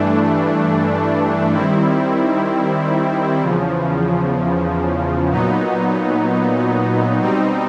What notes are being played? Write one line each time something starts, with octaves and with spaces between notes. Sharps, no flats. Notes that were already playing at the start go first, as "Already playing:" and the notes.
Already playing: G2 E3 A3 D4
D#3 G3 C4 E4
E2 C#3 F3
A#2 F#3 B3 D#4
B2 G3 C4 D#4